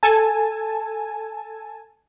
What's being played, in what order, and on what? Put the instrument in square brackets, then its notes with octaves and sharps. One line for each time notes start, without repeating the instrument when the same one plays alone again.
[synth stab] A4 G#5 A5